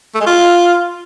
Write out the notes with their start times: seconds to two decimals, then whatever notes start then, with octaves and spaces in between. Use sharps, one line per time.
0.15 A3
0.21 G#3
0.27 F4